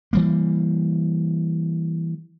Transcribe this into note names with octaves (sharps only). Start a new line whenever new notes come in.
E3 G3 A#3